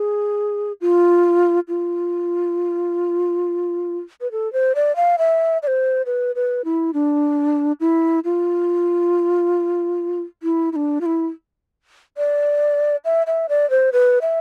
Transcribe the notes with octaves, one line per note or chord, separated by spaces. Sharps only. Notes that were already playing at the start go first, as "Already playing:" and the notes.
Already playing: G#4
F4
F4
B4
A4
C5
D5
F5
E5
D5
C5
B4
B4
E4
D4
E4
F4
E4
E4
D4
F4
E4
D5
E5
E5
D5
C5
B4
E5